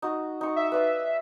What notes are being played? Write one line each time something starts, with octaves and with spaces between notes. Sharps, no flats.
D#4 F#4
D#4 C#6
E5
B4 D5 F5